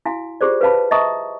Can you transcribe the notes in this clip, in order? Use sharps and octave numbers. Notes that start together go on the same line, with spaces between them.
E4 F#4 F5 G#5
F4 G4 G#4 C5 D5
B4 C5 F5 A5 B5
D#5 E5 A5 A#5 C#6 D#6